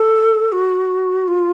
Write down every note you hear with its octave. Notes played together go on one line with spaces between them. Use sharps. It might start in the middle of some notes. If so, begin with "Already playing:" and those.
Already playing: A4
F#4
F4